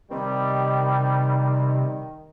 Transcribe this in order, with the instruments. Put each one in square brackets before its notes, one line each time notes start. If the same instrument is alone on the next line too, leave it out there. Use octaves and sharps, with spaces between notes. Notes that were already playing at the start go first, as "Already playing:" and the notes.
[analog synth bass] C3 [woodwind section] D#3 [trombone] G3